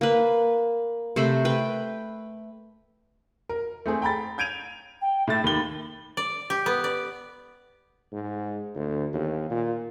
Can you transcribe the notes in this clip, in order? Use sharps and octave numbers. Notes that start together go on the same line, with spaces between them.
A#3 B4
C3 A3 C5 B5
B4 G5
A#4
A3 C4 G#4
G5 A#5 B5 A6
G6 G#6 D7 D#7 F7
G5
A2 A3 E5 A6
D#2 B5 G7
D5
G4
B3
D5
G#2
D2
D#2
A#2